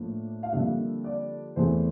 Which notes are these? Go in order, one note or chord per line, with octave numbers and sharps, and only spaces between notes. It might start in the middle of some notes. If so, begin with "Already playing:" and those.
Already playing: A2 F3 A#3 D4
F5
F2 D3 G3 A#3 D4 E5
D5
E2 E3 A3 C4 C5